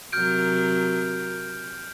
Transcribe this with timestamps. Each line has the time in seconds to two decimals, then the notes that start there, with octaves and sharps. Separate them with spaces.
0.12 C3 F#3 A#4 F6 G6 D7